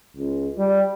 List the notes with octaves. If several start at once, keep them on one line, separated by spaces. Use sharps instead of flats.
C#2
G3